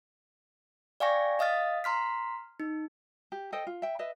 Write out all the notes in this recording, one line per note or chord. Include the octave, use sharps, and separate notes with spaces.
D5 F5 G5 G#5 C#6 A#6
D#5 F5 D#6 F6 A6
A#5 C6 F6 B6
D#4
G4
A4 C5 D#5 G5
F4
E5 G5
B4 D#5 E5